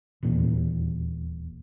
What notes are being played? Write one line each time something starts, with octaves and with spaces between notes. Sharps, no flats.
D#1 E2 A#2